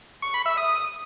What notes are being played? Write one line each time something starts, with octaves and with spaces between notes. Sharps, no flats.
C#6
B5
E5
D#6